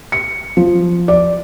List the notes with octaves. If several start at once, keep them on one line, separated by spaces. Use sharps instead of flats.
C#7
F3
D5